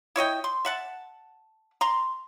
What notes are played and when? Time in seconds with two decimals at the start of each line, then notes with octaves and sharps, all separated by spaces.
0.16 E4 C#5 D#5 G5
0.44 C6
0.65 E5 F#5 A5
1.81 A#5 C6